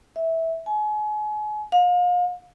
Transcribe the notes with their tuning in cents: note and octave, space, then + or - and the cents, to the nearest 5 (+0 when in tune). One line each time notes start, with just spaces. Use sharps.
E5 -15
G#5 +35
F5 +35